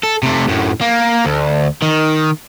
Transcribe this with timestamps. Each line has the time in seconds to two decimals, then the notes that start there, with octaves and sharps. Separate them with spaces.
0.03 A4
0.23 C3 A3
0.49 F#2 A2
0.81 A#3
1.25 D2
1.82 D#3